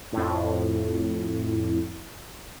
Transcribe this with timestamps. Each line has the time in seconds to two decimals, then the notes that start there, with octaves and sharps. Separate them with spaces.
0.13 F2 A2